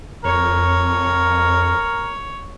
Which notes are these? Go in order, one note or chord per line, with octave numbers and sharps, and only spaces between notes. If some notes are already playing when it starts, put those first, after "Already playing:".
F2 A#4 C#5